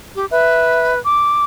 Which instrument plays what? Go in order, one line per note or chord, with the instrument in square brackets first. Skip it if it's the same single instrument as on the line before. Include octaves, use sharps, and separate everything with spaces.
[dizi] G4
[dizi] B4 [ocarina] E5
[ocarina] D6